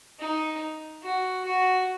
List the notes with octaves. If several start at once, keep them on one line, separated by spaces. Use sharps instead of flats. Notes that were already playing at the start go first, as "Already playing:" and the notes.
D#4
F#4
F#4